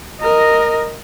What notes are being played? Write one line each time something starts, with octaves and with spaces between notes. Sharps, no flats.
A#4 D#5